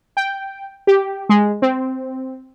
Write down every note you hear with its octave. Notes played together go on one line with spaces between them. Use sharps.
G5
G4
G#3
C4